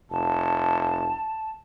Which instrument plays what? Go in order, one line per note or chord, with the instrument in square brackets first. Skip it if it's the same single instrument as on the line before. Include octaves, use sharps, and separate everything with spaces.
[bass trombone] F1 [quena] A5